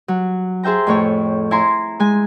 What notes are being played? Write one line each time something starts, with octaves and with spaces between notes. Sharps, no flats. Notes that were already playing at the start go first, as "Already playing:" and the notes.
F#3
G#4 C5 E5 G5 A#5
F2 A2 C#5
E4 G#5 A#5 C6
G#3 G#5